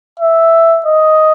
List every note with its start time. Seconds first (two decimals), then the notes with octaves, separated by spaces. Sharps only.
0.19 E5
0.86 D#5